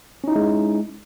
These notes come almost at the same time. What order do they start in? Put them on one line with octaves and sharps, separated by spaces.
C#4 D#4 E4 G#3